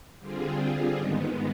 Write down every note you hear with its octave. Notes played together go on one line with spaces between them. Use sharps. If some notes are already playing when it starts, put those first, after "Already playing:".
D3 G3 C4 F4 G#4
G#2 D#3 G#3 B3